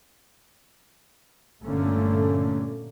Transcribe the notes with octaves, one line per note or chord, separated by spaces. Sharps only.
G1 A#2 D3 A3 A#3 C#4